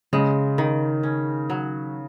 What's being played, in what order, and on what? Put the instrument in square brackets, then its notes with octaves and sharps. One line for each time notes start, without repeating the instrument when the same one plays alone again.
[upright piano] C#3 [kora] G#3
[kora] D#3
C#4
F#3